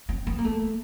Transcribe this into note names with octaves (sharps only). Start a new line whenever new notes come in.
C4
B3
A#3
A3